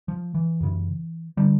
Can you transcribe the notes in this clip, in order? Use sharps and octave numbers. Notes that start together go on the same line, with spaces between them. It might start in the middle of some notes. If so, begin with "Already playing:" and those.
F3
E3
F#2 C#3
D3 G3